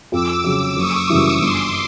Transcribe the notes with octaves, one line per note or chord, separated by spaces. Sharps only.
F2 D6 E6
C#3 F#3
F#1 C#6 D#6
F#2 C#3 E3 G3
G1 C6 D6